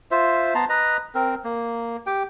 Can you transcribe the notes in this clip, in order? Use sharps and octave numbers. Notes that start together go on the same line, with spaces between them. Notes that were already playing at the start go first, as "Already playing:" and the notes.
F4 C5 E5
B3 A5 A#5 C6
B4 D#5 A#5
C4 A#4
A#3
G4 G5